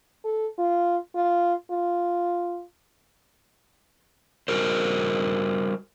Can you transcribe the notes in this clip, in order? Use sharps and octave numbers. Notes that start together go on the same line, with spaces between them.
A4
F4
F4
F4
G3 F#4 A#4 C5